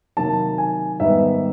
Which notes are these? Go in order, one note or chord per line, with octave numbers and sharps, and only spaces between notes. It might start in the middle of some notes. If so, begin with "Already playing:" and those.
C3 D#3 F#3 A#3 A5
G#5
G#2 D#3 G3 B3 E5